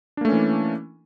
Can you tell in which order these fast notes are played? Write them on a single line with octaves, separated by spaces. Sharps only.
D4 A#3 A3 C#4 E3